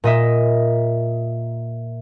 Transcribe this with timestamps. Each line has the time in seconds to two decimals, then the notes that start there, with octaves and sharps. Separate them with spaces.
0.04 A#2 D#5 E5